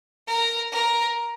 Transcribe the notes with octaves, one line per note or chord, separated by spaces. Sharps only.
A#4
A#4